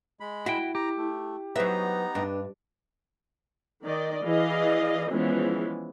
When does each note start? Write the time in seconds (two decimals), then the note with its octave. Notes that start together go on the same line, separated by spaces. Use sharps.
0.20 G#3 B5
0.46 E4 F#4 G5
0.75 G4 A#5
0.97 A3
1.56 F#3 B3 D#4 B4 C5 E5 A#5
2.15 G2 D4 B4 D#5
3.84 D#3 D5 D#5
4.25 E3 G#4 D5 D#5 F5
5.10 E3 F3 G#3 B3 C#4